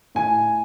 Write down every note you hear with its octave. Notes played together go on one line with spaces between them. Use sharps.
A2 G#5